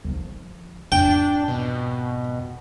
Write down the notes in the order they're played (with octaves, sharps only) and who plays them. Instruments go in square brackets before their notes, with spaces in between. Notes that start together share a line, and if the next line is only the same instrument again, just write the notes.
[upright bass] D#3 F3
[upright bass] F2 G#2 [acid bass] D4 [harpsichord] G5
[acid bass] B2